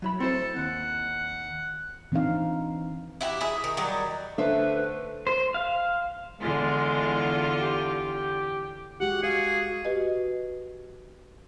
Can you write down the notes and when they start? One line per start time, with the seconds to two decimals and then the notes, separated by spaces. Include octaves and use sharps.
0.02 F#3 E4 B5
0.20 C4 E4 A4 C5
0.56 D#2 F#5
2.12 E3 C4 D4 D#4 F5
3.21 E4 F#4 G4
3.41 E4 G#4 E5
3.64 D#3
3.77 D#3 F#3 G3
4.38 D3 A3 B4 C5 E5
5.27 C5
5.54 F5
6.40 E2 D3 G#3 F4
7.61 G4
9.00 G#3 F#4 G4 F#5
9.23 F#4 G#4 F5
9.85 F#4 G4 B4 D#5